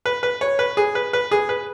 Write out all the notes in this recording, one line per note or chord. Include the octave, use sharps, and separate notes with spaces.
B4
B4
C#5
B4
G#4
B4
B4
G#4
B4